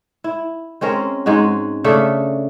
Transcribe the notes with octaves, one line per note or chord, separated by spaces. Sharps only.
E4
G#3 C4 C#4 A#4
G#2 G#3 D#4 F#4
C#3 A3 D4 A4